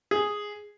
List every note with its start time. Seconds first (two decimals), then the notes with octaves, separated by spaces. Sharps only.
0.11 G#4